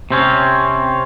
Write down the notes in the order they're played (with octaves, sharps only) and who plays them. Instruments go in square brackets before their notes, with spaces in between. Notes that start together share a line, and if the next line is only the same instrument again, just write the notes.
[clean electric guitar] C3 C4 C#4